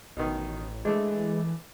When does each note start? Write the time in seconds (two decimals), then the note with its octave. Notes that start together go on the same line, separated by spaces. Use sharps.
0.17 A1 B2 D#3
0.85 E3 G#3 A3 D4